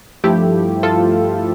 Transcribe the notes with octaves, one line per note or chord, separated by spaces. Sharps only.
G2 F3 A3 E4 G4
F4 A4